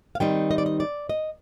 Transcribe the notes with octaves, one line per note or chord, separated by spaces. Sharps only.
F5
D#3 G3 C4 D#4 G5
D#5
D5
D#5
D5
D#5